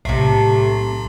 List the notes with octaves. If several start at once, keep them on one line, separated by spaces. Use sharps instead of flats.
B1 A2 C3 A3 C7